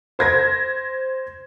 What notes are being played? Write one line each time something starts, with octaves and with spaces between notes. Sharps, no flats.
C5 G#6 A#6